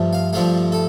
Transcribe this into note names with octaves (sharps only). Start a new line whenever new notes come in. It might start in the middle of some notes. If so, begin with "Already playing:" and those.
Already playing: G2 F3 A3
F5
G2 F3 A3 F5
A4